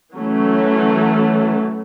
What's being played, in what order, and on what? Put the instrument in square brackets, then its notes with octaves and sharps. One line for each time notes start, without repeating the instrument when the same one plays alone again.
[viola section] E3 F#3 A3 C#4